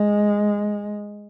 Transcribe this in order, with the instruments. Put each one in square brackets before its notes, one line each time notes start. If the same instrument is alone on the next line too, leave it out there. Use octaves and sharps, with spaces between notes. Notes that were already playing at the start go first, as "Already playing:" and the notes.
Already playing: [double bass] G#3